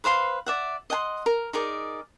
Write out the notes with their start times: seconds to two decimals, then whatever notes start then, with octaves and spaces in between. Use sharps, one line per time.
0.04 B4 C5 F5 C6
0.46 D5 E5 F#5
0.90 D#5 F#5 G#5 C6
1.26 A#4
1.53 D#4 G#4 A#4 D5